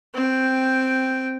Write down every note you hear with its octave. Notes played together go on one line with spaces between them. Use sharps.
C4 G5